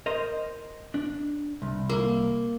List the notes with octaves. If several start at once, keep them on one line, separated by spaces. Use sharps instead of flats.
A#4 C5 D#5
D4
C2
A#3